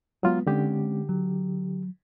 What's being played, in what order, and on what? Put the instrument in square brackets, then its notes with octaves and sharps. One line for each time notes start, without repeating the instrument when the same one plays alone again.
[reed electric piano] F#3 F4 [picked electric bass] G#3 B3
[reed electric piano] D3 G4 [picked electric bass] G#3 C4 C#4
[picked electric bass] F#3